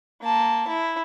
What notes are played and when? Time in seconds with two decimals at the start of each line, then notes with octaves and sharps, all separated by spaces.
0.22 A#3 A5
0.68 E4